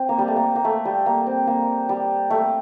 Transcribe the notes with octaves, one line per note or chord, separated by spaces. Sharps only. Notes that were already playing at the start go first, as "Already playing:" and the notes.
Already playing: C4
A#3
G3
A3
A#3
A#3
A3
G3
A#3
C4
A#3
G3
A3